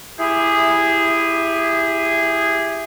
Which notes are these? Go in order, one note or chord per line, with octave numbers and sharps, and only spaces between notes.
E4 G4 G#4